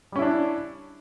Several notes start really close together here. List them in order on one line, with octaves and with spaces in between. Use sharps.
G3 C#4 E4 D4